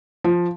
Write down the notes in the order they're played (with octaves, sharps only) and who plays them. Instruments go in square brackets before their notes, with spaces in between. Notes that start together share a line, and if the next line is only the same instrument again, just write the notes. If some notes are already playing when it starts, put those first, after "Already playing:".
[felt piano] F3